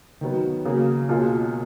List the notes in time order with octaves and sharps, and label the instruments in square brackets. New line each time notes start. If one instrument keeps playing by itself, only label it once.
[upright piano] D#3 F#3 B3
C#3 F#3 A#3
C#2 B2 A#3 F4 G#4